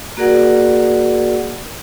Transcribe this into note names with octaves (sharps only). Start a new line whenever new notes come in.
A#3 F#4 G#4 A#4 D5 F#5